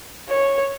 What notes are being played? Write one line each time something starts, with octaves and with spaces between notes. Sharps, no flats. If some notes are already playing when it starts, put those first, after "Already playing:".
C#5